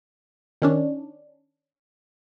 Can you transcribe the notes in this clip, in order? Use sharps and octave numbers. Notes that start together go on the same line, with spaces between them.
D#3 C#4 D4